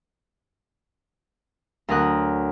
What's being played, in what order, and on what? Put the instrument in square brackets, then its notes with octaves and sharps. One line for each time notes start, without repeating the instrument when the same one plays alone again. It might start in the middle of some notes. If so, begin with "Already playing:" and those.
[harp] D2 F#3 A#4 D#6 F#6